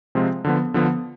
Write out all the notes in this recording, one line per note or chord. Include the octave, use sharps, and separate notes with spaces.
C3 F3 G#3 C4 F4
D3 F3 B3
D3 F3 B3